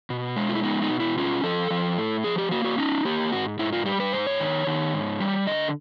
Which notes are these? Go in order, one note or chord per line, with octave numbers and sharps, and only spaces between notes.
B2
G#3
F4
E4
B3 D#4
D#4
B2
E4
C#4 F4
F3 A4
F3
A2
F3 G#4
G4
A#3 F#4
F#4
C#4 D#4
A#3 G4
G#2 F#4
G#2 E4
F4
G3 G4
B4
G#2 C5
C#5
D#3
D#3
G#2
G3
D3 D#5